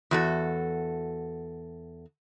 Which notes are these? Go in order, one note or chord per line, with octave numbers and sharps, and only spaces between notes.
E2 F#4 A4